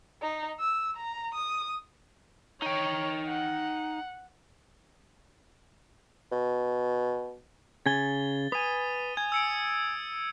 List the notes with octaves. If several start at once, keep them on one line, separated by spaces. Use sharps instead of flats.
D#4
E6
A#5
D#6
D#4 C#5 G5
F#5
B2
C#3 G#5 A6 G7
B4 G#5 D#6 D#7
G#5 G#6
E6 C#7 D7